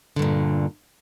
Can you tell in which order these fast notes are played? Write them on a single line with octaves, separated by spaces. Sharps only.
D3 G2 A#2